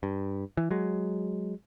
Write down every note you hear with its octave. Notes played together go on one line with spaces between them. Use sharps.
G2
E3
F#3 G#3